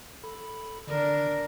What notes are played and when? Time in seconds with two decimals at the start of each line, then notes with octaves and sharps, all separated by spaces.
0.24 A4 B5
0.87 D3 D#3 D4 A#4 D5